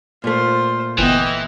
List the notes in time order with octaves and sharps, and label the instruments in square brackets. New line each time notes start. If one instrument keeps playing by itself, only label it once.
[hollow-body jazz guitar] A#2 A3 [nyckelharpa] F4 C5
[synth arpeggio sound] G1 B3 [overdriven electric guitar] E3 [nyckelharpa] D#5 G5